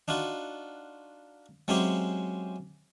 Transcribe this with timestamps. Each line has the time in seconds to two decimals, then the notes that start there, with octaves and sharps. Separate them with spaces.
0.08 D4 D#4 F4 F#4
1.68 F#3 G#3 C4 C#4 E4 G4